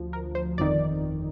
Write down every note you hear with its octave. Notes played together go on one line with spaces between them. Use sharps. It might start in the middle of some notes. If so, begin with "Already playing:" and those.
Already playing: D2 F3
A#4
C5
G1 F2 D#3 D5